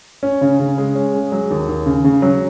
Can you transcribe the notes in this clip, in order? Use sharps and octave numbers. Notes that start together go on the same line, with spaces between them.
C#4
C#3
C#3
G#3
C#4
G#3
F#3
D#2
D#2
C#3
C#3
F#3